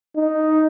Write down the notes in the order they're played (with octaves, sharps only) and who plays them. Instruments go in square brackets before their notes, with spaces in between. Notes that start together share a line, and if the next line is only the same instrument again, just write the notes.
[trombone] D#4